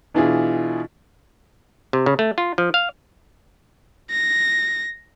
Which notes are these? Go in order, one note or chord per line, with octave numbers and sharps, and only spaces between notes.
B2 E3 D4 E4 F4 G#4
C3
C#3
A3
F4
F3
F5
A#6